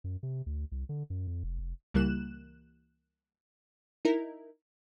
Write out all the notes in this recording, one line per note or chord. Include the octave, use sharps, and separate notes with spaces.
F#2
C3
D2
C2
D3
F#2
F2
F1
F1
C#2 E3 G3 A#3 F#6 E7
D#4 E4 A#4